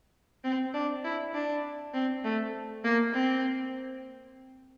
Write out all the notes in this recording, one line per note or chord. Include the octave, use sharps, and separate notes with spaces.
C4
D4
E4
D4
C4
A3
A#3
C4